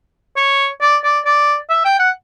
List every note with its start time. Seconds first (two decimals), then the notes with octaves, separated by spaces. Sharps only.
0.37 C#5
0.81 D5
1.04 D5
1.25 D5
1.70 E5
1.85 G5
1.99 F#5